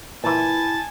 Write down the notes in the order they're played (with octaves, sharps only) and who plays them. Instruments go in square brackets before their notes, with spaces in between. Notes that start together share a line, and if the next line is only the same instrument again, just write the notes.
[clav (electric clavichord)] A#2 E3 [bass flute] E4 [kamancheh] G#5 [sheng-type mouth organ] A5